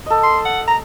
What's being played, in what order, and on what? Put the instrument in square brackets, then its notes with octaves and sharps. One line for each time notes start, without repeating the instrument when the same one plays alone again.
[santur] A4 D#5
[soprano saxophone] C6
F#5
A#5